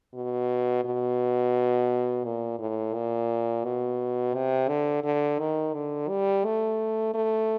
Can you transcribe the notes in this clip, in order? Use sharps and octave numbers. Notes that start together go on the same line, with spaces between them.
B2
B2
A#2
A2
A#2
B2
C3
D3
D3
D#3
D3
G3
A3
A3